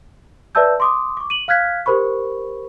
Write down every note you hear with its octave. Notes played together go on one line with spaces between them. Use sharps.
B4 D5 E5 A5 E6 G6
C6 D6 D#6
C#6 D6
D#7 F#7
F5 F6 F#6 G#6 B6
G4 A#4 C5 B5 C#6